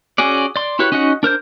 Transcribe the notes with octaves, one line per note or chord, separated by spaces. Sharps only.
C#4 F#4 G#4 D5
D5 C6
E4 F#4 G4 B4 C#5
C#4 D#4 F#4 D#5 F#5
D4 A#4 C5 G6